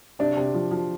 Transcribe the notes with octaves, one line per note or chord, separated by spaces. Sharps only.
C3 D4
C3
F3
F3